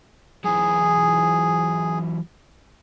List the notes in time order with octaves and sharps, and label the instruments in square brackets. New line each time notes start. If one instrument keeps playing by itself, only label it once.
[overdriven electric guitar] E3 F#3 [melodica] G#4